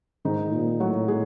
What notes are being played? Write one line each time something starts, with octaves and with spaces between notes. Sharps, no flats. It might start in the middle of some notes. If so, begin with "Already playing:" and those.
G#2 D#3 D#4
A#2
A2 F#3 F#4
G#3 G#4